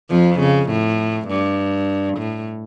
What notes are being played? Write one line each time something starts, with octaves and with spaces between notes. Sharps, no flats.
F2 F3
C#3
A2
G2
A2